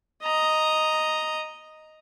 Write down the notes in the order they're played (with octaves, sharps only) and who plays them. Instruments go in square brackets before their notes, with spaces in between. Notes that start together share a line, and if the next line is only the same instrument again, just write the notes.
[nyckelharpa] D#5 A#5